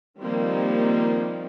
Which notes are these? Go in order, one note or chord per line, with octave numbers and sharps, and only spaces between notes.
D#3 F3 G3 A#3 C4 D#4